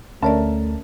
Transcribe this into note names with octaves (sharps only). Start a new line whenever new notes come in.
D2 A3 C#4 A#4 C#5 D5 E5 A5